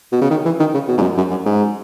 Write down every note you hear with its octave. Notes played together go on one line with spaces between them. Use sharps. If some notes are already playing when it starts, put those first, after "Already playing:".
B2
C#3
D#3
E3
D#3
C#3
B2
G#2
F#2
F#2
F#2
G#2